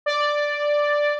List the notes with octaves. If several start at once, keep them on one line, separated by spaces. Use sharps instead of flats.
D5